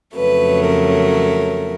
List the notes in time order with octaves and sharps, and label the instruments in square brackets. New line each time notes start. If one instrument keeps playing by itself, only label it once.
[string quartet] F2 C#3 F#3 A3 B4
A#4